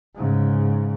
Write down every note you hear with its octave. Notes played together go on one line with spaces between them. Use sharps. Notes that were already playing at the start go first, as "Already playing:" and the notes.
G#2 C#3